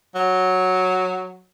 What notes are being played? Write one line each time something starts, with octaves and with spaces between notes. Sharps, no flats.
F#3